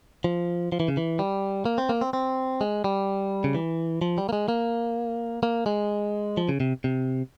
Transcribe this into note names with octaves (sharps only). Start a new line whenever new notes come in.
F3
F3
E3
C#3
E3
G3
A#3
C4
A#3
C4
C4
G#3
G3
C#3
E3
F3
G3
A#3
G#3
A#3
A#3
G#3
F3
C#3
C3
C3